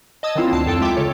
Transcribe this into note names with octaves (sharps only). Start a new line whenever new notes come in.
D#5 A5 D#6 E6 G#6
D#3 F#3 A#3 C4 E4 F4
D2 A5 C7
F2 A4 G5 A5
G#3 F4 E5 G5 D6
C#3 A4 C#5